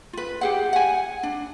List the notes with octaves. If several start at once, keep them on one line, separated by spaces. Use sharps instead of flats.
F4 B4
G4 G#4 F#5
F#5 G#5
D4